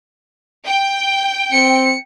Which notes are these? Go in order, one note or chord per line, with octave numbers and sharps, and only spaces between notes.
G5
C4 C#7